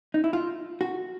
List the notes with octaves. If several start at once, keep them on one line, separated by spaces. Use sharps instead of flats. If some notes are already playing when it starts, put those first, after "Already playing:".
D#4
E4
F4
F#4